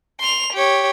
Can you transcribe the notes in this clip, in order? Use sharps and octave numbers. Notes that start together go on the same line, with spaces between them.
C6 F7
G4 C#5